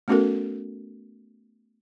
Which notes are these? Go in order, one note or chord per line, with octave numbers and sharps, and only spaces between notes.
A3 B3 C#4 F#4 A4 A#4